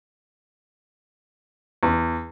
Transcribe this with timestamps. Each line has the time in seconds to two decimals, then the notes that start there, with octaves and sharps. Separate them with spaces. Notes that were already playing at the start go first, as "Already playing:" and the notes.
1.83 E2